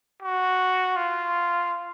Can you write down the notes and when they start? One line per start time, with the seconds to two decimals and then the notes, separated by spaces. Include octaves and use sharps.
0.22 F#4
0.96 F4